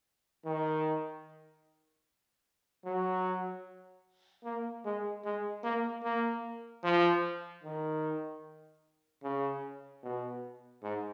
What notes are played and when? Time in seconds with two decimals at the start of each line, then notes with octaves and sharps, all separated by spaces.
0.46 D#3
2.85 F#3
4.44 A#3
4.85 G#3
5.25 G#3
5.64 A#3
6.03 A#3
6.84 F3
7.64 D#3
9.23 C#3
10.03 B2
10.83 G#2